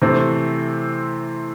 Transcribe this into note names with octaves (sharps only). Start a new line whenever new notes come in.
C3 E3 A3 C4